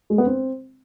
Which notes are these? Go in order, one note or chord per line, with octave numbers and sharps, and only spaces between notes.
G#3
B3
C4